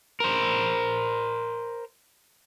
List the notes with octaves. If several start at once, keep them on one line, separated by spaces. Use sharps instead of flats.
A#4 C5